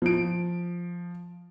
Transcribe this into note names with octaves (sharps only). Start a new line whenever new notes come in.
F3 D7